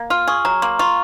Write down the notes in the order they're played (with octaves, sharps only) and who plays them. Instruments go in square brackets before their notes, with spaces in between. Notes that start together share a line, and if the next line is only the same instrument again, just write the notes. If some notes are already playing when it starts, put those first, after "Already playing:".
Already playing: [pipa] A#3
[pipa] F4 [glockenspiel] F6
[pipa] G#4 [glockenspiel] C#6
[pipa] F#3 [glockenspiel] A#5
[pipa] A#3 [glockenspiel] C6
[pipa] F4 [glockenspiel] C#6